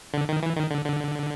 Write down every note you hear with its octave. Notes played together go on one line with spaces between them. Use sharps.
D3
D#3
E3
D#3
D3
D3